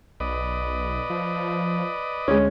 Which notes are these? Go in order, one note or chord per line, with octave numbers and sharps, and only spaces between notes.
B1 B4 D5 D#5
F3
D2 G#3 C#4